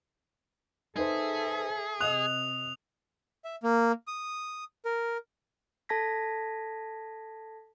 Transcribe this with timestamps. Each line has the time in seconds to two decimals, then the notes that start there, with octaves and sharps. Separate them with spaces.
0.96 D#4 G#4 A4 B4 C5 E5
2.01 C3 D#5 D#6 F#6 F7
3.45 E5
3.63 A#3
4.07 D#6
4.85 A#4
5.89 A4 A5 G#6 A#6 B6